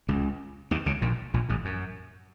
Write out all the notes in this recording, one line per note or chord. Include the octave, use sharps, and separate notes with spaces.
C#2 C#3
D#2 D#3
C#2 C#3
A#1 A#2
A#1 A#2
A1 A2
F#2